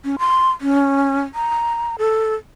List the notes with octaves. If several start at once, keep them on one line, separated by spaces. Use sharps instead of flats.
C#4
C6
C#4
A#5
A4